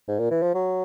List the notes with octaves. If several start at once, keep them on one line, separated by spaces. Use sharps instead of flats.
G#2
A#2
E3
F3
F#3